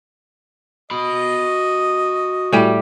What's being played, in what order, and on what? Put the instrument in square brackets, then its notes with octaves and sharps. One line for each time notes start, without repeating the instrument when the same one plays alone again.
[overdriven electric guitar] F#4 B5 [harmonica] D#5
[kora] A2 G3 G4